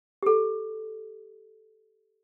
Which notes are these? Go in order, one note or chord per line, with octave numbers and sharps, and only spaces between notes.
G4 A4